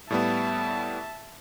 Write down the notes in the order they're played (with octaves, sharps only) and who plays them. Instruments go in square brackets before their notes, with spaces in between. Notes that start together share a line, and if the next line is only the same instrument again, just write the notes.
[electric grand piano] A2 G3 B3 [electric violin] E5 A5